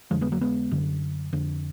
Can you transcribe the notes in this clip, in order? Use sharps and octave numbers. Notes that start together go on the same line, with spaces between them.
F2 D3 F3 G#3
G#3 B3
F#3 A#3
G#3 B3
F#2 D3
F2 D3